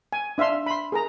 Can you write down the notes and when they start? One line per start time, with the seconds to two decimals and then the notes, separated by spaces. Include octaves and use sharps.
0.13 G#5
0.38 D4 E5 F5 C6
0.66 B5 C6
0.92 G#4 A#4 A#5